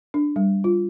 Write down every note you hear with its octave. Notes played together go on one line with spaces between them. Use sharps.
D4
G3
F4